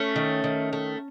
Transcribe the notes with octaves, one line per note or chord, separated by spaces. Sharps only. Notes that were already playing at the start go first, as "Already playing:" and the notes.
Already playing: A3 C#4
D#3
D#3
A3